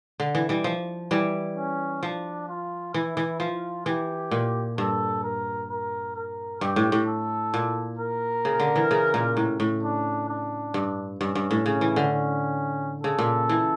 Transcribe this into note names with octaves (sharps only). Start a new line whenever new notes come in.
D3
E3
E3 G3
F3
E3 G3
C#4
F3 D4
F4
E3 E4
E3
F3 F4
E3 G4
A#2
G2 A4
A#4
A#4
A#4
G2 G4
A2
A2
A4
A#2
A#4
C#3
D3
E3
C#3
A#2
A2
A2
D4
D4
G2
G2 C#4
G2
A2
C#3 C#4
E3
D3
C#4
C#3 A4
A#2
E3